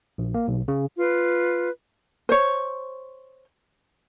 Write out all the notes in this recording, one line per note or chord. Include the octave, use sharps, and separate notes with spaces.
A#1
A#3
B1
C#3
F4 B4
C5 C#5